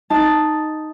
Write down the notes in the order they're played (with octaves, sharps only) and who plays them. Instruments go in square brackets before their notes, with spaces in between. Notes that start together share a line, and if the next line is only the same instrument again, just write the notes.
[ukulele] D#4 [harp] A5 A6